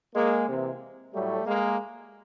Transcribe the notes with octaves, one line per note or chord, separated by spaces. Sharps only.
G#3 A#3
C3 E3
A2 F#3 G3 A3
G#3 A#3